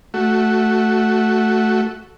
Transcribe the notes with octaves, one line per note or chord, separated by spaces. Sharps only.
A3 F#4